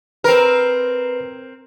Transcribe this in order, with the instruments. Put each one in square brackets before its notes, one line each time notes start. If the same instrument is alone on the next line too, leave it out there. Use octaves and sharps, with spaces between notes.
[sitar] C4 A#4 [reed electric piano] B4